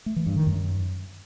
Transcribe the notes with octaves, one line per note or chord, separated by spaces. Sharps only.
A3
E3
G2
D#3
F#2